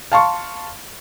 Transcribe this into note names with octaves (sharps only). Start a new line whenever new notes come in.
F5 A5 C6 C#6